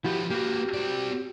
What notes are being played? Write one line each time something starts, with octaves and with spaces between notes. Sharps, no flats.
F3 E4 F#4 G4 B4
A#3 F#4 G4 B4
C4 D5